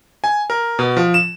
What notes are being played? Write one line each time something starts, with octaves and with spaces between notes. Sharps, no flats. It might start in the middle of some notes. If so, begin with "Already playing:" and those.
G#5
A#4
B2
F3
E7